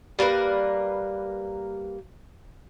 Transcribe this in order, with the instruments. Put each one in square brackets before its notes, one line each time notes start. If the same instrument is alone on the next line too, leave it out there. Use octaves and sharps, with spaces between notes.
[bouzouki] G3 A#3 A#4 B4